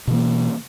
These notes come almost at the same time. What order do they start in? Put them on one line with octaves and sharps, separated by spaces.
B2 E3 A#3